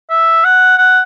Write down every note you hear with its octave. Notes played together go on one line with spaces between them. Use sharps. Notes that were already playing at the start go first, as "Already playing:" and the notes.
E5
F#5
F#5